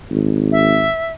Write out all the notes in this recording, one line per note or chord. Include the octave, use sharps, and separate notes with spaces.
G#1
E5